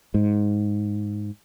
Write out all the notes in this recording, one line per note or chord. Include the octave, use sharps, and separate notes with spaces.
G#2